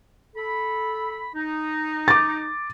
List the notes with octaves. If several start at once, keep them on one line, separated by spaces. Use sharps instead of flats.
A4 B5
D#4
D6 A6